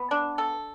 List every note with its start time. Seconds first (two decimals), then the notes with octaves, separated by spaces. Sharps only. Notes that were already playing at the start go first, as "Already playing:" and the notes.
Already playing: B3
0.11 D4
0.38 A4